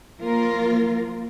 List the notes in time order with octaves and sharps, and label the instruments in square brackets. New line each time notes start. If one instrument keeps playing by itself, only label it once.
[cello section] F3 A#3 F4 A#4